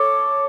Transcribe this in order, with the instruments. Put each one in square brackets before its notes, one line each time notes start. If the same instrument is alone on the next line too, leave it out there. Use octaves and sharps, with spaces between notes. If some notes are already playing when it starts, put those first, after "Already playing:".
Already playing: [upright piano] A4 C#5 [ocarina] D6